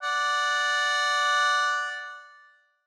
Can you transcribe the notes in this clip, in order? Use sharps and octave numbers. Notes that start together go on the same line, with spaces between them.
D5 F#5